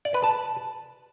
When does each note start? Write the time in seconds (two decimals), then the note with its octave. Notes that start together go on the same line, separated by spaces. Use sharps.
0.05 D5
0.14 B4
0.24 A5